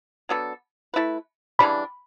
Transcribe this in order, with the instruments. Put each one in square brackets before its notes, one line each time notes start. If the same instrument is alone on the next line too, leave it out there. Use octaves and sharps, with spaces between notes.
[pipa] F#3 B3 D4 A4
A3 E4 B4
[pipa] C#3 E3 G3 D4 [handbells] B5